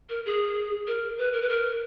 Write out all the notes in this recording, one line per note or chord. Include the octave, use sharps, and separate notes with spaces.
A#4
G#4
A#4
B4
A#4
B4
A#4